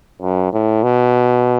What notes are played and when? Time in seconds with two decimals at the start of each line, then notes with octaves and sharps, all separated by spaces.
0.22 F#2
0.53 A2
0.84 B2